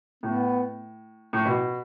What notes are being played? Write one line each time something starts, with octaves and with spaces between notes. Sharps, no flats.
A2 B3
A2
B2